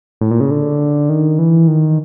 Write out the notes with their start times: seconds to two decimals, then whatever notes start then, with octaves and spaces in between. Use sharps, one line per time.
0.21 A2
0.31 A#2
0.40 C#3
0.51 D3
1.09 D#3
1.39 E3
1.67 D#3